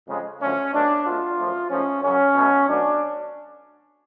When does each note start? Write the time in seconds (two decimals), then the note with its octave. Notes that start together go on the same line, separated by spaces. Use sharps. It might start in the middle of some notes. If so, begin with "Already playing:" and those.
0.08 F2 C#3 G#3
0.40 F#2 D3 F3 A3 C#4
0.73 B2 A3 D4
1.06 B2 A3 F4
1.39 F#2 F3 A3
1.70 G#2 F3 A3 C#4
2.02 F#2 C#3 F#3 C#4
2.36 B2 F#3 A3
2.67 B2 F#3 A3 D4